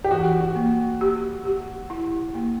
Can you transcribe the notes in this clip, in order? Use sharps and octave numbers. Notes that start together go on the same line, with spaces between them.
G4
E3 F#4
F#4
A#3
G4
G4
E4
A#3